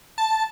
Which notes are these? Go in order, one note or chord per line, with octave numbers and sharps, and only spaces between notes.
A5